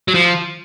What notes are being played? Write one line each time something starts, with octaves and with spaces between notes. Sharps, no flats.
F#3
F3